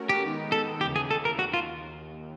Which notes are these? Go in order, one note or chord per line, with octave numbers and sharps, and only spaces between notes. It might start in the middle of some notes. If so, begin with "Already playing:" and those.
Already playing: A3 C#4 F#4 A#4
G4
D#3 G#3 B3 D#4
A4
D#2 C#3 E3 G4
G#4
A4
A#4
D#2 F#4
F4